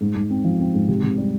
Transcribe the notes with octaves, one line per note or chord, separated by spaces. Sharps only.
G#2
G#2
C4
F3
C4
G#2
C3
C3
G3